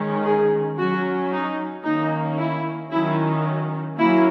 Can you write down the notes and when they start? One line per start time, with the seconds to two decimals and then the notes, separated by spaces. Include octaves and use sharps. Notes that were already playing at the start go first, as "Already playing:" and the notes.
Already playing: D#3 G#3 C#4
0.25 G#4
0.79 F#3 C#4 F#4
1.32 D#4
1.85 D#3 A#3 C#4 D#4
2.38 E4
2.91 D#3 F#3 C#4 E4
3.98 F#3 A#3 C#4 E4